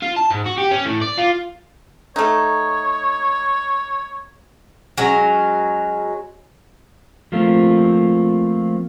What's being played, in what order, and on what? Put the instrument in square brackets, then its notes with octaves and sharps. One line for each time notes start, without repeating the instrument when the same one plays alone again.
[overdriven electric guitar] F4
A5
G#2
F#4
G4
C#4
A2
D5
F4
[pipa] A3 D#4 [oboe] C#5
[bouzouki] F#3 G#3 C#4
[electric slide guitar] F3 A3 A#3 C4 F4